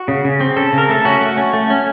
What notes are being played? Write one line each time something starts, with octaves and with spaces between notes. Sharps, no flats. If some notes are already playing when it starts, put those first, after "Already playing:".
Already playing: F#4
C#3
C#3
C4
C#3 A4
C#3
A#4
A3 A4
C#4 F#4
A3
C#4
A3
C#4